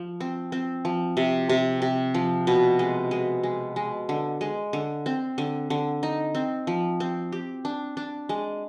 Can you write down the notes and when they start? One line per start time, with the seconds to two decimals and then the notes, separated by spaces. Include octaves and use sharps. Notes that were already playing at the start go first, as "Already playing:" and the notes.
Already playing: F3
0.20 C4
0.52 C4
0.85 F3
1.17 C3
1.49 C3
1.82 C3
2.14 F3
2.47 B2
2.79 G#3
3.11 G#3
3.43 G#3
3.76 G#3
4.09 D3
4.41 G#3
4.73 D3
5.06 C4
5.38 D3
5.70 D3
6.03 D#4
6.35 C4
6.67 F3
7.00 C4
7.32 G4
7.65 D4
7.97 D4
8.29 G#3